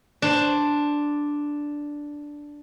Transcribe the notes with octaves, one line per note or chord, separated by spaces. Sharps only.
D4 C5